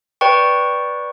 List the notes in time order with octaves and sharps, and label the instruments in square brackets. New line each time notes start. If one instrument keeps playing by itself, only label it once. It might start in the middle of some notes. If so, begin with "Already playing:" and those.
[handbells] B4 D5 G5 C#6